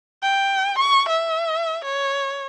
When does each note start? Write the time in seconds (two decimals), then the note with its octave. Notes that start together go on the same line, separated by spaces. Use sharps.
0.23 G5
0.79 C#6
1.09 E5
1.85 C#5